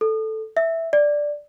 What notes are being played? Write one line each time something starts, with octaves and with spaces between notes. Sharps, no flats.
A4
E5
D5